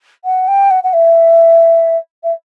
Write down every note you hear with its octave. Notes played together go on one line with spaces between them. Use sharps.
F#5
G5
F#5
F#5
E5
E5